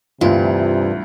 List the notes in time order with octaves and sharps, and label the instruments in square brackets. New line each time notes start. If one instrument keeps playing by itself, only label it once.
[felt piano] D2 E3 [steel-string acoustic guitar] G2 [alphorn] C3 [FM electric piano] F4